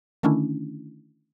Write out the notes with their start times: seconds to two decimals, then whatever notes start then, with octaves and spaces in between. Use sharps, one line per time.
0.23 D3 D#3 A3 C#4 D4 E4